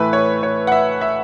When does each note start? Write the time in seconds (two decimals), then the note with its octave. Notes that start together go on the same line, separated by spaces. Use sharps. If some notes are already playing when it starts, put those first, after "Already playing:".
Already playing: A2 E3 A3 E4 B4
0.13 C#5
0.43 C#5
0.67 F#5
0.72 E5
1.01 E5